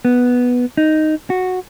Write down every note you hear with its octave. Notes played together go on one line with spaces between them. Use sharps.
B3
D#4
F#4